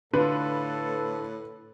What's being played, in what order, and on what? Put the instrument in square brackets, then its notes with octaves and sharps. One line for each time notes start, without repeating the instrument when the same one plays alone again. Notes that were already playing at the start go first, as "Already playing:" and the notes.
[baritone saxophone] A2 [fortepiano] D3 F4 [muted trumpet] A4 [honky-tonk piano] B4